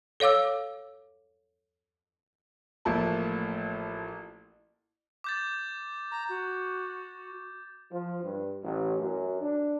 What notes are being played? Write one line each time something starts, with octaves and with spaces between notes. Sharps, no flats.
A4 C#5 F5 D6 E6
A1 F3 A3 A#3 A5
D6 G6 A6
A#5
F#4
F3
G2
A1
F#2
D4